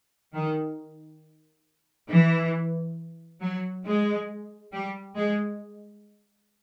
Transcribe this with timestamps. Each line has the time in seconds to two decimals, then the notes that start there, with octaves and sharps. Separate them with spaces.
0.33 D#3
2.09 E3
3.41 F#3
3.85 G#3
4.72 G3
5.16 G#3